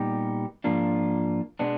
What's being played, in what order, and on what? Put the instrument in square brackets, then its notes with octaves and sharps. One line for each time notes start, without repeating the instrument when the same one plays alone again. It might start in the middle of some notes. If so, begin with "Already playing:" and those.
Already playing: [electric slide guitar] A#2 G3 B3 D#4 G4
G#2 F3 A#3 D4 F4
B2 G#3 B3 D4